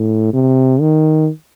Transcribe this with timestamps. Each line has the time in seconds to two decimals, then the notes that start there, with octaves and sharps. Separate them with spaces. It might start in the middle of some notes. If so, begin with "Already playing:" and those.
Already playing: A2
0.33 C3
0.81 D#3